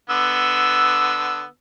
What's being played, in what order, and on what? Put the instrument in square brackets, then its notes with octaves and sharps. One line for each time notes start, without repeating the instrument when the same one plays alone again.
[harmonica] D3 B3 E6